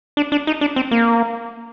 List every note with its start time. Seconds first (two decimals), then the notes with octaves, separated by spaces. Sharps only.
0.17 D4
0.32 D4
0.47 D#4
0.61 D4
0.76 C4
0.91 A#3